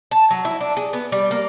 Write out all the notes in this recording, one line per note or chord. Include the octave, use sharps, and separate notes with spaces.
A5
F#3
E4
D4
G#4
B3
G3
A#3